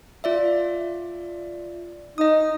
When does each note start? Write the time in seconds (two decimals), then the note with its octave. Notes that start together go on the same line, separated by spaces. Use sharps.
0.24 F4 D5 E5
2.18 D#4 D#5 D#6